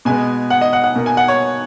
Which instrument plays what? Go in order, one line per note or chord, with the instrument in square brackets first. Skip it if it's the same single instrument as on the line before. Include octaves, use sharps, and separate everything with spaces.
[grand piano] B2 G#3 B3 G#5
F#5
D#5
F#5
F#5
B2 A#3
G#5
F#5
C#5